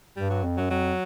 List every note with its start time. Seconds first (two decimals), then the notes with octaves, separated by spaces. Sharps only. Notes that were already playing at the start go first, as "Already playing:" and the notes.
0.16 G2 G3
0.30 F#3
0.44 F2
0.57 F#2 F#3
0.70 F2 F#3